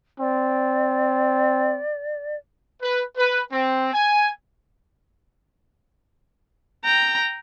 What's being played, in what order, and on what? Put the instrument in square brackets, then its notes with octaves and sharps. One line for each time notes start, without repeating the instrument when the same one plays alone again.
[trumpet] C4 [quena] D5
[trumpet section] B4
B4
C4
G#5
[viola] G5 A#5